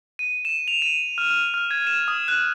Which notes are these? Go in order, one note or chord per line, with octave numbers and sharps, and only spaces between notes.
D#7
E7
F7
D#7
F6
F6
F6
G#6
E7
D#6
F#6